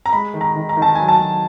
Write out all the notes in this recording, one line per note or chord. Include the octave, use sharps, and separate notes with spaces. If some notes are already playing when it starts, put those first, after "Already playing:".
A#5
G#3 B5
D#3
A#5
D#3
A#5
D#3
A5
F#3 G#5
A5
F#3